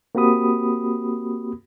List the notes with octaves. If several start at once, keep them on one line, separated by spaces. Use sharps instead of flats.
A#3 C4 F#4 G4 B5 D#6